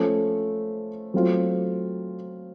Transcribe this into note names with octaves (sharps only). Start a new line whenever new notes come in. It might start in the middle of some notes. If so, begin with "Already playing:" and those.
Already playing: F3 A3 C#4
F#3 A3 C4 F4